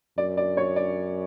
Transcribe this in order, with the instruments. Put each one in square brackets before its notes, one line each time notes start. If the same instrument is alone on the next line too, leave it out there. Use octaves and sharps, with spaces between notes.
[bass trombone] F#2 [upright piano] D5
[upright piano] D5
C#5
D5